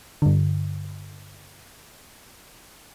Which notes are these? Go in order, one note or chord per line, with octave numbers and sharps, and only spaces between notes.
G2 D3